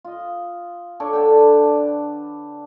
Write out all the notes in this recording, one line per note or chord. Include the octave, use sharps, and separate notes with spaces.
F4 D#5
D4 A4 C#5 D5
D3 D4 G5
B4